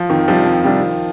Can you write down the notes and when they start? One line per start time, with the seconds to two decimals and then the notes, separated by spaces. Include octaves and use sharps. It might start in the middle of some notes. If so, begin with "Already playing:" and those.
Already playing: F3
0.09 F2 D#3
0.28 C3 F3 G3 D4
0.46 F2
0.64 C3 G3 D4